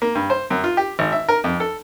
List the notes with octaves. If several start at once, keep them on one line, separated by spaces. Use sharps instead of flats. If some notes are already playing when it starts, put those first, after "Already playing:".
A#3
G2
C5
F#2
F4
G4
G#1
E5
A#4
F2
A4